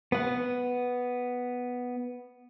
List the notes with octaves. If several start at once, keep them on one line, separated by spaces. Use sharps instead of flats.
B3 F#5